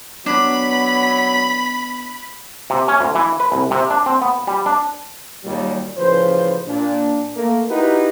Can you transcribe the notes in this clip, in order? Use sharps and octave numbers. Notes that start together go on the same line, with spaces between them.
F#3 B3 D4 B5
C3
C#4
D2
E3
B4
C2
C3
D4
C4
B3
G3
D4
D#2 A#2 F#3 G3
A1 C#3 F3 B4 C5
A#2 D4
A3 A#3
D#4 E4 F#4 G4 A#4 B4